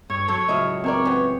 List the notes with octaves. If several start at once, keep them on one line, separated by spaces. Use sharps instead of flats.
G2 C#5
F#3 A4 C#5
C#2 A2 F#3 E4 D#5 F6
B2 C4 A#4 C#5 D5
E3 B3 C5